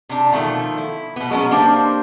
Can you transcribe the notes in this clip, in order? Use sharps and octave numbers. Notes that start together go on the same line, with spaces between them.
C3 D4
B2 D#3 F3 A3
E4
B2 B3
F#3 G#3 A#3 B3 C#4
A#3 D4 G4 C5